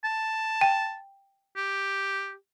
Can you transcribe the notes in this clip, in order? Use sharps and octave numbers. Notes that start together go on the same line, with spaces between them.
A5
G5
G4